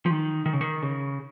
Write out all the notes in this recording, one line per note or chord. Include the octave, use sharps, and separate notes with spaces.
F3
D#3
D#3
C#3
D#3
C#3